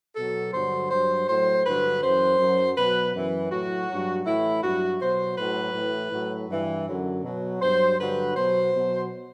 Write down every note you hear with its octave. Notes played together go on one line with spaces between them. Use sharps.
B2 F#3 A4
G2 D3 F#3 C5
G2 F#3 C5
A2 F#3 C5
G2 D3 F#3 B4
F#2 E3 C5
F#2 F#3
B2 F#3 B4
F#2 E3
A2 F#3 F#4
G2 F#3
A2 E3 E4
G2 F#3 F#4
B2 F#3 C5
A2 F#3 B4
A2 E3
A2 F#3
G2 E3
F#2 D3 F#3
B2 F#3
G2 F#3 C5
G2 D3 F#3 B4
B2 F#3 C5
B2 F#3